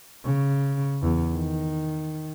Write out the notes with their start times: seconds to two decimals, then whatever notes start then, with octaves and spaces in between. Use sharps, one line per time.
0.25 C#3
1.02 E2
1.34 D#3